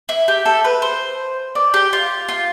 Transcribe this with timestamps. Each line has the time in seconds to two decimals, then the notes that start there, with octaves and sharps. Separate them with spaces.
0.09 E4
0.28 G4
0.46 A4
0.65 B4
0.82 C5
1.55 D5
1.74 G4
1.93 F4
2.29 F4